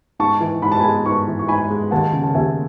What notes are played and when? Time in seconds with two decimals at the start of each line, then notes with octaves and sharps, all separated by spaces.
0.19 G#2 A5 C#6
0.40 E3
0.62 G#2 B5
0.72 A5
0.80 G#3 G#5 B5
1.05 G#2 A5 C#6
1.27 E3
1.39 C#6
1.48 G#2 G#5 B5
1.70 G#3
1.91 D#2 F#5 A5
2.13 C#3
2.24 A5
2.35 D#2 E5 G#5